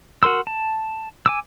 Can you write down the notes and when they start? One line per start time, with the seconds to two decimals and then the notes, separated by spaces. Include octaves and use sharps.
0.23 F#4 A#4 C6 E6
0.47 A5
1.26 G#5 D6 E6